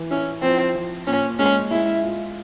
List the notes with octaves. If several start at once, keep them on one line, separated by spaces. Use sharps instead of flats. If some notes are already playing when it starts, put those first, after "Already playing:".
Already playing: E3
C#4 E4
F3 C4
F3
A#2 C#4
G#3 C#4
G#3 E4
F4